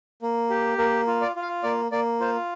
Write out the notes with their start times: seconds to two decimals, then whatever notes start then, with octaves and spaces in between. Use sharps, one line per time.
0.22 A#3
0.50 G4
0.78 A#3 A#4
1.07 F4
1.21 D5
1.36 F4
1.42 F5
1.63 A#3 D5
1.92 A#3 D5
2.20 F4 C5